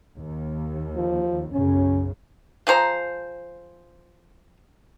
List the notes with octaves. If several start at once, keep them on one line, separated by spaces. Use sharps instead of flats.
D#2
F3
B1 F#2 C#3 C#4
F3 G#4 C5 A#5